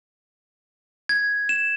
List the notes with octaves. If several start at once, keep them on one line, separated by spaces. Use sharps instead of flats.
G#6
E7